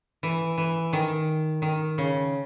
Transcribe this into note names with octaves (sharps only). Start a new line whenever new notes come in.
E3
E3
D#3
D#3
C#3